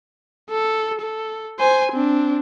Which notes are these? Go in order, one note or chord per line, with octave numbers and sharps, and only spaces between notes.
A4
A4
C5 G#5
C4 D4